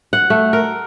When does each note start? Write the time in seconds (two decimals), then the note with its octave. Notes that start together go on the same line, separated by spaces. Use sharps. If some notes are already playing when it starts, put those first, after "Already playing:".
0.13 F#5
0.30 A3
0.53 A#4